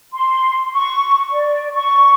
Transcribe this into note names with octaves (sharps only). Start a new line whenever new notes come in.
C6
C#6
D5
C#6